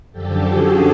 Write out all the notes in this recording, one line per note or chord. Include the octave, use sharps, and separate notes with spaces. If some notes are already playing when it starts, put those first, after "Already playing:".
F#2 D3 F3 G4 A4
F#4 G#4